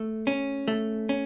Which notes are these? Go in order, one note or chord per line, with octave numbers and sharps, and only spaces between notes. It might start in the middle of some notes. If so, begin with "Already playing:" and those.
Already playing: A3
C#4
A3
C#4